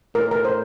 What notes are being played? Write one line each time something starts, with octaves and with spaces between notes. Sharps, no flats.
A2 A#4
A#4
C5